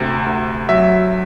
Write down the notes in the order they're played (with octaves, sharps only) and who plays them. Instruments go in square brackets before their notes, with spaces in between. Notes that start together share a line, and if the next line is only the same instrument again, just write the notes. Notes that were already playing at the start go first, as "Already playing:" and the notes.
Already playing: [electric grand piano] D2 C3
D2
F#3 E5